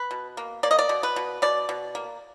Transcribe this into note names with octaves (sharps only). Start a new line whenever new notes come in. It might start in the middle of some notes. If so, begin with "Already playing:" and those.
Already playing: B4
B2
A#3
A#3 D5
D#5
D5
B2
B4
B2
B2 D5
B2
A#3